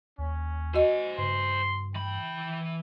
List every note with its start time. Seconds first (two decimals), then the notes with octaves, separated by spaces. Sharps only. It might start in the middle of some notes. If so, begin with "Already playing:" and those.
0.18 D#2 C#4
0.74 F#4 C5 D#5 G#5
1.18 G2 C#3 C6
1.95 E3 G5 B5